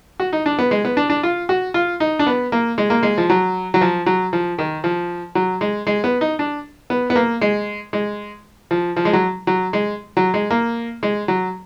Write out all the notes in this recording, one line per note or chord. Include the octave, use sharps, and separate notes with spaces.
F#4
D#4
D4
B3
G#3
B3
D4
D4
F4
F#4
F4
D#4
D4
B3
A#3
G#3
A#3
G#3
F3
F#3
F#3
F3
F#3
F3
D#3
F3
F#3
G#3
G#3
B3
D#4
D4
B3
B3
A#3
G#3
G#3
F3
F3
G#3
F#3
F#3
G#3
F#3
G#3
A#3
G#3
F#3